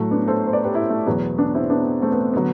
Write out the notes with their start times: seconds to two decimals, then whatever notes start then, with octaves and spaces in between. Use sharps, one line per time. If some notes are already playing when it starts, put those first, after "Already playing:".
Already playing: A2 F#3 A3
0.11 B3 D4
0.28 A4 C5
0.47 C5
0.53 B4 D5
0.64 G4 B4
0.75 E4 G4
0.90 A3
1.06 E2 B2 F#3 B3
1.38 B3 D4
1.54 C4 E4
1.70 B3 D4
2.02 A3 C4
2.12 B3
2.33 D3 F#3 B3